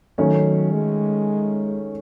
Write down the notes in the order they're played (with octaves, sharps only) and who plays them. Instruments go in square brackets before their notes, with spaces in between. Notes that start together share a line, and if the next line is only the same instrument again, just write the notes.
[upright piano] D#3 A3 C#4 [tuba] F#3
[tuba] G#3